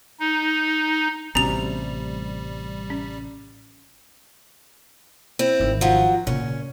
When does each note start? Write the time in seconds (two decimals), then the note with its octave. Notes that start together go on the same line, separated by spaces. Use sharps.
0.19 D#4
1.35 A1 C3 G3 B3 C#4 F#4 A#5 F7
2.90 C#4
5.39 C4 E4
5.60 G#1 D#3
5.81 F3 F#3
6.27 A#2 C#3 C#4